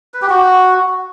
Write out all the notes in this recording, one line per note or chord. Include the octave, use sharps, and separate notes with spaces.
B4
G4
F#4